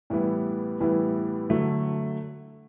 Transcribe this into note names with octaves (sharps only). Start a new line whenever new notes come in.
A2 E3 G3 B3 E4
A2 E3 G3 B3 E4
D3 F#3 A3 E4